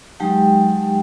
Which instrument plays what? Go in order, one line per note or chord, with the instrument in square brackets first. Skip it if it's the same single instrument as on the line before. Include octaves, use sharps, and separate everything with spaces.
[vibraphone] F#3 G#3 D#4 G4 G5 A5